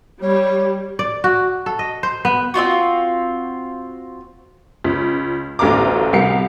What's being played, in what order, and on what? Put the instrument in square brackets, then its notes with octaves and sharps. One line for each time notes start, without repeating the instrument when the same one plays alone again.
[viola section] G3 [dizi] C#5
[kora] D5
F#4
A4
D#5
C5
B3
[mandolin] C4 D#4 F4 F#4
[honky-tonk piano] C#2
A1 D2 A3 F5 A#5 D6
C2 G4 A#4 C7 C#7